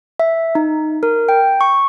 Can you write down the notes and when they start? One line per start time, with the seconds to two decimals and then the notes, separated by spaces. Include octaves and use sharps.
0.20 E5
0.55 D#4
1.03 A#4
1.29 G5
1.61 C#6